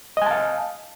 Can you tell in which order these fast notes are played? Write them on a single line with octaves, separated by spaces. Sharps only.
D#5 G#5 A5 F5